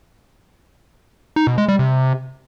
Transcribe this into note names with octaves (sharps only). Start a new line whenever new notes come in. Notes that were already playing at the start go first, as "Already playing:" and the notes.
D#4
B2
G#3
G3
C3